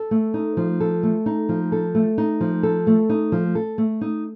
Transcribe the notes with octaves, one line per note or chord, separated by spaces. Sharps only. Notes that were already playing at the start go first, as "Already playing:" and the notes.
Already playing: A4
A3
D#4
F3
A4
A3
D#4
F3
A4
A3
D#4
F3
A4
A3
D#4
F3
A4
A3
D#4